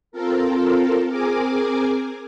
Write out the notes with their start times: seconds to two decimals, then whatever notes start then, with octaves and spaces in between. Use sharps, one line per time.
0.12 C4 F4 A4 A#4
1.08 C4 G#4 A#4 G#5 D6